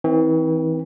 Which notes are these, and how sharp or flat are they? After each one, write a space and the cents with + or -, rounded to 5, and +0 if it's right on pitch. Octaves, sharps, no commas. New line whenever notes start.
E3 -40 C4 +0